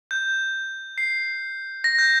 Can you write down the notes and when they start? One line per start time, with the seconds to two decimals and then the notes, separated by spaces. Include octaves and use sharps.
0.11 G6
0.98 C7
1.84 A#6
1.98 G6